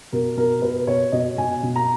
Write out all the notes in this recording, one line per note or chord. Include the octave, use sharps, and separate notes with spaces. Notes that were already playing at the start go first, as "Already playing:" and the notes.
B2 A#4
B2 A#4
B2 B4
B2 C#5
B2 D#5
B2 G#5
B2
A#5